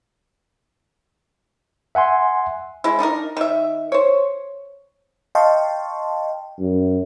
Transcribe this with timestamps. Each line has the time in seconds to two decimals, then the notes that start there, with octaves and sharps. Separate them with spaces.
1.95 E5 F#5 G#5 C6
2.84 G#3 E4
2.99 D4 D#4 G4 A#4
3.37 D#3 E5
3.92 C5 C#5
5.35 D#5 F5 G5 A5 C6 C#6
6.59 F#2